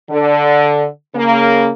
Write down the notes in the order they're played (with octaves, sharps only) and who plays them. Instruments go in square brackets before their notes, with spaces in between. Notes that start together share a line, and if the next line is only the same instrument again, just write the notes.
[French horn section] D3
C#3 A#3